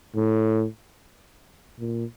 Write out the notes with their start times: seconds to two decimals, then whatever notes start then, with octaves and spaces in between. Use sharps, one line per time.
0.16 A2
1.80 A#2